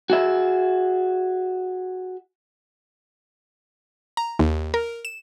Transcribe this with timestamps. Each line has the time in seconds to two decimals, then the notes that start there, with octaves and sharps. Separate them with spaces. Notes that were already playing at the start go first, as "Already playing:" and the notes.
0.10 F#4 G#4 E5
4.17 A#5
4.39 D#2
4.74 A#4
5.05 E7